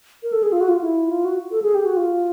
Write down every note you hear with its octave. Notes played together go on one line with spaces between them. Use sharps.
A#4
A4
G#4
F4
F#4
F4
E4
F4
F#4
A4
G#4
G4
F#4
F4